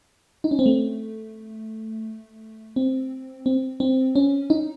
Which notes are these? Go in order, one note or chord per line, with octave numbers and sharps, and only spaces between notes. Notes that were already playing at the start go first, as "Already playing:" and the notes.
D#4
C#4
C4
A3
C4
C4
C4
C#4
D#4